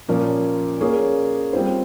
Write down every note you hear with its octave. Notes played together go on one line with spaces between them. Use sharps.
A#2 F3 A#3 C#4
A#3 C#4 G#4 C#5
G3 C4 F4 C5